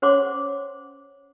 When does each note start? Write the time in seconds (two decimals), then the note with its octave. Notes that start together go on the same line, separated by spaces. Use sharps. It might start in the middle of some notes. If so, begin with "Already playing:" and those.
0.02 C#4 C5 C#5 F#5 C6 D6